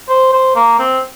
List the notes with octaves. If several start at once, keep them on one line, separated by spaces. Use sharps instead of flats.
C5
C5
A#3
C4